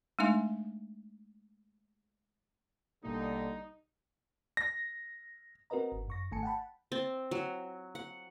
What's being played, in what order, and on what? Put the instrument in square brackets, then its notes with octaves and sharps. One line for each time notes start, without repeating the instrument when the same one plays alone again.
[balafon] G#3 A3 D4 D#4 E5 G#5
[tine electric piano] A#1 B2 A#3 [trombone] D3 [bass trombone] G3 [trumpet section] D#4
[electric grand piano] A#6
[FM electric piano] C4 F#4 A#4 B4 D#5 A#5
G1
F#2 C#6 A#6
G#1 D#3 A3 G#5 A5 C#7
F#5 G5 A5 B5
[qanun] C4
F#3
F#5